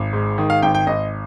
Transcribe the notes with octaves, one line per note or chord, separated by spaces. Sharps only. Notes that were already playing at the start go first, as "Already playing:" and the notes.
Already playing: G#1
G#2
D#3
F5
G#1 G5
G5
G#1 D#5